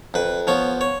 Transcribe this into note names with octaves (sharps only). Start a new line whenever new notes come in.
F2 B4
F3 B3 C#5
C#5